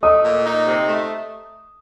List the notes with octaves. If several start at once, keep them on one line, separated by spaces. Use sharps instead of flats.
A3 D#5 D#6
A#2
D#4
C3
A3